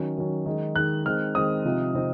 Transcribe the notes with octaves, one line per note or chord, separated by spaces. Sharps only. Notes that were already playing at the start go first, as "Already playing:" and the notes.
Already playing: D#3 F#3 C#4
D#3 F#3 C#4
D#3 G#3 D#4
D#3 G#3 D#4 F#6
D#3 G#3 C4 F6
D#3 G#3 C4 D#6
C3 F3 C4 D#4
C3 F3 C4 D#4